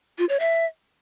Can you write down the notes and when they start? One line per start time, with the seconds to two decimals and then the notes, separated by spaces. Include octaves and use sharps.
0.18 F4
0.29 C#5
0.40 E5